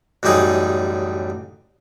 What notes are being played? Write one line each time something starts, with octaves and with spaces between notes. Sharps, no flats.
A1 F#2 G3 D#4 G#4